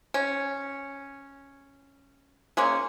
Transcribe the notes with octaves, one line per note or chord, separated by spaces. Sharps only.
C#4
G#3 A#3 C#4